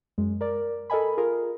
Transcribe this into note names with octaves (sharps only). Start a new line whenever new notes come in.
F#2 G#3
A#4 D5
A4 A#4 D#5 G#5 B5
F4 G#4 A#4